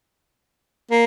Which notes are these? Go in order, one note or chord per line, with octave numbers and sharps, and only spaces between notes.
A#3